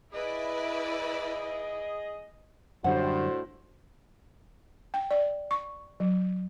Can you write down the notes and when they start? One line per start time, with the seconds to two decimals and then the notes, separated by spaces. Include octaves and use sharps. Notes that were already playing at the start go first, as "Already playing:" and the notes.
0.13 E4 G#4 B4 D5 D#5
2.84 F#2 A2 D3 G3 D4 F#4 C5 F#5
4.94 G5
5.11 D5
5.51 C#6
6.00 F#3